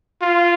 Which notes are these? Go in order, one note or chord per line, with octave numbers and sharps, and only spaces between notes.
F4